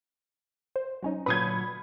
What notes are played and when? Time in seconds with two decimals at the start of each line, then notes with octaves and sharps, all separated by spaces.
0.76 C5
1.02 F#3 C#4 D#4
1.26 A#2 D3 F#3 B4 B5 D#6 G6 G#6